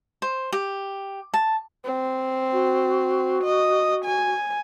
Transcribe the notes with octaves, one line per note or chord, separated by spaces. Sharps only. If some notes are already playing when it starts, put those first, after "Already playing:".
C5
G4
A5
C4
F#4
D#5
G#5